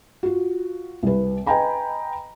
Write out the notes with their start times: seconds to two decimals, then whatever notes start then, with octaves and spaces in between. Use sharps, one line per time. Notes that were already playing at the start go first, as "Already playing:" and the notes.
0.23 F4 F#4
1.03 C2 B4
1.46 B4 D#5 G5 G#5 A#5 B5